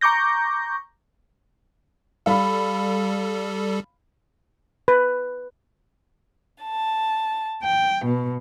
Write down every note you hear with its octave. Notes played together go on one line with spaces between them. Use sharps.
A#5 C#6 D6 G6 A#6
G3 A4 F5 B5
B4
A5
G5
B2